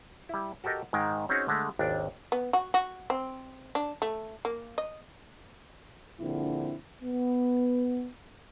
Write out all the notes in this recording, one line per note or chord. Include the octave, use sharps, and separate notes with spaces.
G3 E4
F#4 G4 A4 A#4 D#5
G#2 D#3 G#3 G5
C4 C#4 D#4 F#4 G#4 C#5
D3 G#3 A3
G#1 D#2 D4
B3
F#4
F#4
C4
D4
A3
A#3
D#5
A#1 D3 C4 E4
B3